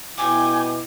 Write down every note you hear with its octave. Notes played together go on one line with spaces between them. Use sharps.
B2 E4 G5 G#5 D6